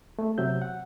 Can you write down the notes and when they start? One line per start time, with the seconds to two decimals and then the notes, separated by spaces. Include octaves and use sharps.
0.19 A3
0.38 C3 F#3 E5 G6
0.62 F#5